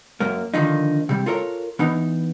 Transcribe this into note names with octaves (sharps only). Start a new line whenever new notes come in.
F#2 A#3
D3 D#3 F3 A#3 D#4
C3 G3
F4 A4 A#4 C#5
E3 B3 D#4